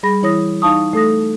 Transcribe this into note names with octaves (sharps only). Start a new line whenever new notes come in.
G3 G#4 B5 A#6
E3 E4 C#5 D#6 A#6
D#4 F5 A5 C#6 D#6
A3 A4 D#6 A#6